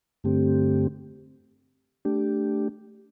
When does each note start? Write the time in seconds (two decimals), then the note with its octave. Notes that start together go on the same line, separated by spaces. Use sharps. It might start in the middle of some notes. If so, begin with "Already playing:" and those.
0.24 G2 D3 A3 C4 G4
2.05 A3 D4 G4